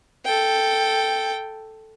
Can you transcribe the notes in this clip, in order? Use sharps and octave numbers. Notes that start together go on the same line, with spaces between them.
A4 G5